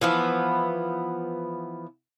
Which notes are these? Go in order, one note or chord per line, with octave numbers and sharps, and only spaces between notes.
E3 F3 B3